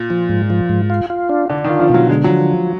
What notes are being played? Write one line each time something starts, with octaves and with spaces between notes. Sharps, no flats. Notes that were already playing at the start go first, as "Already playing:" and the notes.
Already playing: A#2
F3
G#2
F3
G#2
F4
F4
D4
D3 D4
D#3
F4
F3
B2 F#3
D3 G#3
F#3
F3